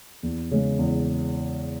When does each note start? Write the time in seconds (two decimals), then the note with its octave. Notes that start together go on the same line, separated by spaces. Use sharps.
0.23 E2
0.51 C#3 G#3
0.79 E2